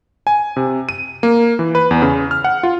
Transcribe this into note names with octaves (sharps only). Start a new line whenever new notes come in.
G#5
C3
D#7
A#3
E3
B4
E2
C#3
F6
F#5
F4